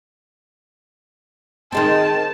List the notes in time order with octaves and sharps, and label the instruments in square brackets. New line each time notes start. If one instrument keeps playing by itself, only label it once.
[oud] D#3 G#3 C4 [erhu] A5